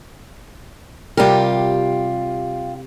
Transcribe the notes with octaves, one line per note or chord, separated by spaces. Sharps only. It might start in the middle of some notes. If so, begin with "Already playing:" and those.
C3 G3 F4 G4 A#4